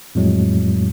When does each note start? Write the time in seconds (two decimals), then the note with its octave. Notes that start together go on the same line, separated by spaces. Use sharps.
0.15 F2 A2 F#3 G#3